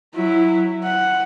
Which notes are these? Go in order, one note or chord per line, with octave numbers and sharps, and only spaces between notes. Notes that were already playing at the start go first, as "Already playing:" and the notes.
F#3 E4
F#5